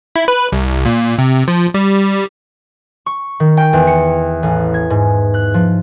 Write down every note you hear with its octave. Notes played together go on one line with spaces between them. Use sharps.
E4
B4
C2
A#2
C3
F3
G3
C#6
D#3
G5
E2
C#7
A1
G#6
G#2
F#6
F3